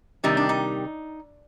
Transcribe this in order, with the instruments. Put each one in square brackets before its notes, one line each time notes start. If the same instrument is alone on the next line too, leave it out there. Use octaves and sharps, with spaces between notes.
[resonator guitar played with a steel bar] C3 D#3 G3 D#4
D4
D#4